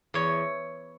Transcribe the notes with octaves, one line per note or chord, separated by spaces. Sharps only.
E2 C#5